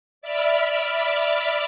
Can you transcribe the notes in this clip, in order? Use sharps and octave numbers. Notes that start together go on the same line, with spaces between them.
D5 E5 B5 D6 F6